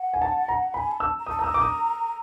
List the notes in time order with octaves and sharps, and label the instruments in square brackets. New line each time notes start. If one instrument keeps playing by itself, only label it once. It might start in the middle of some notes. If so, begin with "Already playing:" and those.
Already playing: [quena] F#5
[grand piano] G#5
A5
A#5
[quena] G#5 [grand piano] B5
[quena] A5
[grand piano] E6
[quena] A#5
[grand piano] D#6
[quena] A5
[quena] A#5 [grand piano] D#6 E6
[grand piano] D6
D#6